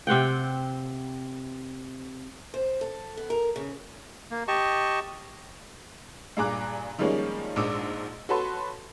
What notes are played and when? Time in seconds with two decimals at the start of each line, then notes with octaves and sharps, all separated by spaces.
0.07 C3 C4 F#5 G5
2.54 C5
2.81 A4
3.17 B3
3.30 A#4
3.56 C#3
4.31 A#3
4.48 G4 D#5 A5 C#6
6.37 G2 A#2 G#4 A#5 D6 F#6
6.98 D#3 F3 G3 G#3 A#3 C#4
7.56 A#1 G#2 D4 D#4 D6 E6
8.29 F#4 A4 B4 C#5 A5 C6